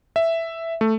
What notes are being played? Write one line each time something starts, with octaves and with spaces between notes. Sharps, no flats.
E5
A3